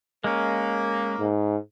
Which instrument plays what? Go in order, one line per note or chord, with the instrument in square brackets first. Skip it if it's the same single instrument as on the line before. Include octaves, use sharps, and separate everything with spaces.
[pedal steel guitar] G#3 C#4 [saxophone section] A#3
[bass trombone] G#2